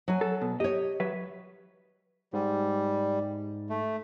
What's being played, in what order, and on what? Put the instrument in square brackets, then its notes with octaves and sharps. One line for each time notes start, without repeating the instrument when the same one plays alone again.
[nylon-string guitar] F#3 G#5
[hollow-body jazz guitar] A4
B2
[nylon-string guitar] G4 C#5 [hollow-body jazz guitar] D#5
[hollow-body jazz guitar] F#3 B4 E5
[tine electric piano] G#2 [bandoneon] G3
[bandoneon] A3